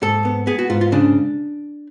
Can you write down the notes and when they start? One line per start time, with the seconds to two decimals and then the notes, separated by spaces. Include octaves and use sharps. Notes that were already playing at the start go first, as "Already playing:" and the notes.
0.02 G#2 A4
0.25 B3
0.47 B3 G#4
0.59 F#4
0.70 G#2 F4
0.81 F4
0.92 C#3 D4